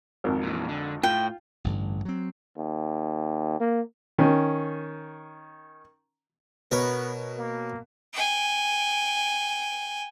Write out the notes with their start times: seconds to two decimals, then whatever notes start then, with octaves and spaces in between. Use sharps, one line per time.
0.24 G#1 F2 A#4
0.43 A#2 E3
0.69 D3
1.03 A2 F4 G5
1.64 A1 G2 D3
2.05 F#3 C4
2.57 D#2
3.60 A#3
4.18 D#3 C#4
6.71 B2 B3 A#4 B4 C#5
7.37 A#3
8.13 G5 G#5